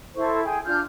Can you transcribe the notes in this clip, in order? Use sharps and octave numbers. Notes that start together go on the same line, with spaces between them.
E4 A4 C5 C#6
G#4 G5 G#5
D4 F4 F6 G6